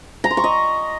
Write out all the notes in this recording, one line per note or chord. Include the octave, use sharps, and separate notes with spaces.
A#5
C6
C#6
D#5